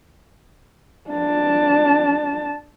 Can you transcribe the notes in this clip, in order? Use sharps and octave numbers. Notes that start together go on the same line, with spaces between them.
D4 A5